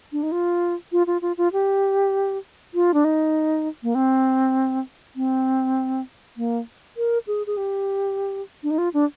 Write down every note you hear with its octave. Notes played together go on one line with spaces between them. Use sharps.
D4
D#4
F4
F4
F4
F4
F4
G4
F4
D4
D#4
A#3
C4
C4
A#3
A#4
G#4
G#4
G4
D4
D#4
F4
D4